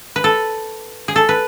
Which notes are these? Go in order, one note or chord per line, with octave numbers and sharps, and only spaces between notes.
B4
A4
G#4
A4
B4